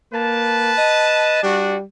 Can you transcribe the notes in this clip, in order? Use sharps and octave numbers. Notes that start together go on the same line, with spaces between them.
A#3 B4 A5
D#5
G3 D4 F#4